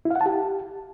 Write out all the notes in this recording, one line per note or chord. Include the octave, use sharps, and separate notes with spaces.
E4
F5
F#5
A5
G4